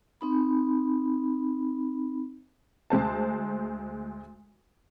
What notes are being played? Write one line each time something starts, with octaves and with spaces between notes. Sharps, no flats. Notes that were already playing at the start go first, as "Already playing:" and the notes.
C4 D#4 B5
D2 G#3 C5 A5